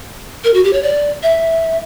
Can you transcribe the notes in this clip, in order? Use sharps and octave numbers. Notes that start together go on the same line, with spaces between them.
A#4
F#4
G4
C#5
D5
E5